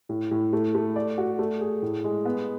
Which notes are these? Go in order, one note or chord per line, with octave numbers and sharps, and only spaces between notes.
A2
A2
A3
A3
D5
F#4
A3
G#4
A2
G#3
B3